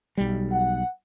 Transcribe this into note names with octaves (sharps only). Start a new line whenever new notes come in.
B1 G3
F#5